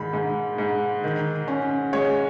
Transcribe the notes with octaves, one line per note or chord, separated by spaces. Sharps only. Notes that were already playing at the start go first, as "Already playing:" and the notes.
Already playing: G#2 D#3 B5
G#2
G#2
D#3
C#4
G#3 C#5